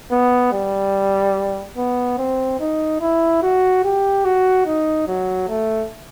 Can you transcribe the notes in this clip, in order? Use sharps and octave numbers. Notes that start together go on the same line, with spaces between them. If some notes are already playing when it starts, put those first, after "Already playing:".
B3
G3
B3
C4
D#4
E4
F#4
G4
F#4
D#4
F#3
A3